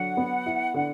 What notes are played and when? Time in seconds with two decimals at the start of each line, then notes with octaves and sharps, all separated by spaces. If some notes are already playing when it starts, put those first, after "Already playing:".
Already playing: D3 F#3 F#5
0.17 B3
0.46 E4
0.74 D3